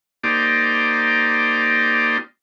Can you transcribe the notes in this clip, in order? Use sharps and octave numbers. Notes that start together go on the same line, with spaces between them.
A#3 D#4 G4 C5 D5